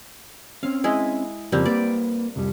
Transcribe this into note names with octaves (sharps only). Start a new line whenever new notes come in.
C4 C#4 F5
G#3 E4 G#4
F2 C#3 F3 G3 A#3 C4
A#3 B4 D5
C2 F2 G3